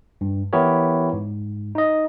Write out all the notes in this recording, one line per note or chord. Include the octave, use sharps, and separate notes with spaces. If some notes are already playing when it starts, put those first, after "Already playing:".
G2
E3 B3 E4 G4 A#4 C#5
G#2
D#4 D#5